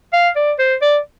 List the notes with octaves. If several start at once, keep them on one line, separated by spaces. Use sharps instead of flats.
F5
D5
C5
D5